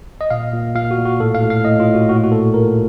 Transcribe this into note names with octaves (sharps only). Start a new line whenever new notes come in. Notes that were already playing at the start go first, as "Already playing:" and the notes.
D#5
A#2 F5
A#2
A#2 F5
F#4
A#2
F#4
A2 A4
F5
A2
F5
A2 D#5
F4
A2
F#4
A#2 F#4
F4
F#4
A#2 A4
A#2 A#4